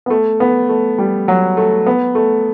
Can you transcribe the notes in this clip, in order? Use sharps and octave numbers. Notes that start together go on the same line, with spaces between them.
B3
A3
B3
A3
G3
F#3
A3
B3
A3